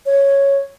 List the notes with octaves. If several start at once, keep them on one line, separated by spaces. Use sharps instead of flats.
C#5